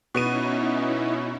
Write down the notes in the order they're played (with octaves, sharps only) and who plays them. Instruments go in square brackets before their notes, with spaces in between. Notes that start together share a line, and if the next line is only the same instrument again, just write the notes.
[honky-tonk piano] B2 B3 D#7 [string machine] C#4 D#4 E4